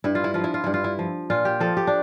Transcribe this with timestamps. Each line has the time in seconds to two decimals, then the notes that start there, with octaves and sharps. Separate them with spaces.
0.04 G2 E4
0.15 F4
0.24 E4
0.34 F3 F4
0.44 E4
0.54 F4
0.64 G2 E4
0.74 F4
0.84 E4
0.99 F3
1.30 A#2 F4
1.45 G4
1.60 F3 A4
1.77 G4
1.87 D4